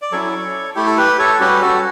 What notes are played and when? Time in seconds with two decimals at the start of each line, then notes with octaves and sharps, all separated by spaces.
0.02 D5
0.12 F#3 C#4 E4 A4 C#5
0.75 A3 E4 G4
0.86 A4
0.98 G4 B4
1.19 A4 C#5
1.40 G3 C#4 F#4 G4 B4
1.61 F#4 A4